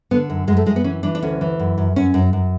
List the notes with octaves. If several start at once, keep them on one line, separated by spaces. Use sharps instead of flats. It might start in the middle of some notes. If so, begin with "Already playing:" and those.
D3 B3
F#2
F#2 G#3
A3
F#2 G#3
B3
E3 C#4
E3 D4
D4
D2 C#4
E3
F#2
F#2
F#2 C#4
F#2
F#2